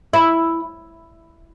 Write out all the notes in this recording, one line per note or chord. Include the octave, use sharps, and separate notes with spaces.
E4